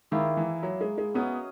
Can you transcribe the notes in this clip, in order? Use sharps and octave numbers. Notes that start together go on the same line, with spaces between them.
D#3 A#3 E4 G#4
E3
F#3
G#3
G#3
F#3 B3 C#4 G#4 D#5